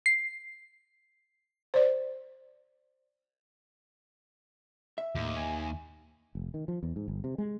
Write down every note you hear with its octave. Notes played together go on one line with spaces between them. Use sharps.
C7
C5 D5
E5
D#2 A2
G#5
F1
D#3
F3
E2
G#2
G1
C3
G#3